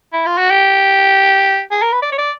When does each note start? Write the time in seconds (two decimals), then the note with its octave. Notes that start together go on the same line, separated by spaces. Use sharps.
0.13 E4
0.26 F4
0.38 F#4
0.50 G4
1.71 G#4
1.82 A#4
1.93 B4
2.02 D5
2.12 C#5
2.18 D5